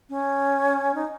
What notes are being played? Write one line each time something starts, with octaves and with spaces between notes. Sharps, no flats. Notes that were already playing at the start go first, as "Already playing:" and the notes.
C#4
D#4